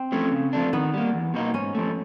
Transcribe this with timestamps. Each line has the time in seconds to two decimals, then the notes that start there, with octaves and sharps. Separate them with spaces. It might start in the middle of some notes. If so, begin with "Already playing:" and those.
Already playing: C4
0.12 F3 A3 C#4
0.32 C#3
0.53 F3 A3 D4
0.73 D#3 B3
0.94 G3 A#3
1.14 E2
1.34 B2 F#3 A#3 D#4
1.54 G#2 C#4
1.75 F3 A3